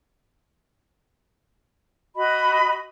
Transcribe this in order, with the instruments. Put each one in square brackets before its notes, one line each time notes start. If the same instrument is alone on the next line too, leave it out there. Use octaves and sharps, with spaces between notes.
[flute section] F#4 D#5 B5